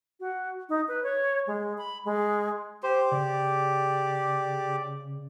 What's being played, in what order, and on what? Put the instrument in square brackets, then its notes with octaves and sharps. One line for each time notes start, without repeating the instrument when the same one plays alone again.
[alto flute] F#4
D#4
B4
C#5
G#3
B5
G#3
[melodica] G4 [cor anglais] C5
[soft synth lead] C#3 [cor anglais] D5